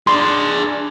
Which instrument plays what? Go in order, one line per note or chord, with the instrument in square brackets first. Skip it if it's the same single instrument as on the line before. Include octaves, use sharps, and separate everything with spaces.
[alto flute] D4 [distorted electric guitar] G#4 D5 [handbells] C6